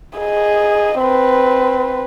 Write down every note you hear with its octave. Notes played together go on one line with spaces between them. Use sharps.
G#4 D#5
C4 B4